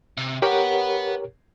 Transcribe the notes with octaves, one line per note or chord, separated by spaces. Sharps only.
C3
G4 A#4 B4 C#5 F#5